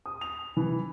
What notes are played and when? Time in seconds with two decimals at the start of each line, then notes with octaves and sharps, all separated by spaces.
0.06 D#6
0.21 F7
0.57 E3